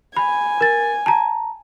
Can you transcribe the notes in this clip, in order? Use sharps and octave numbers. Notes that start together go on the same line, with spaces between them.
G#5 B5
A#4 A6
A5 A#5